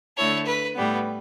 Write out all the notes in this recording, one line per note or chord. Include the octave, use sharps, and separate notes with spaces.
D3 A3 E4 A4 C#5
B4
A2 G3 B3